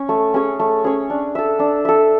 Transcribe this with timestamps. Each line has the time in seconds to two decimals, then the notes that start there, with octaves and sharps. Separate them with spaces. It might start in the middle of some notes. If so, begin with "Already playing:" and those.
Already playing: C#4 C#5
0.09 A3
0.34 C#4 G#4 C#5
0.60 A3
0.84 C#4 G#4 C#5
1.10 D4
1.35 A4 E5
1.59 D4
1.85 A4 E5